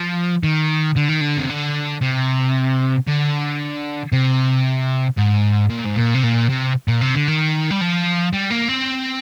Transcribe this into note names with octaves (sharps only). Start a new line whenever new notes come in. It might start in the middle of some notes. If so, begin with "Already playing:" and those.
Already playing: F3
D#3
D3
D#3
D3
C3
D3
C3
D3
C3
G#2
A#2
G#2
A#2
C3
A#2
C3
A#2
C3
D3
D#3
G3
F3
G3
A#3
C4